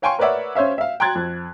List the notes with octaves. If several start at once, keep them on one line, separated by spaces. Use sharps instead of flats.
C#5 F5 G5 G#5 C6 C#6
A#4 B4 C#5 D5 E5 F#5
C#4 C5 C#5 E5 F5
E5 F5
G5 A#5 C6 F#6 G#6 A6
F2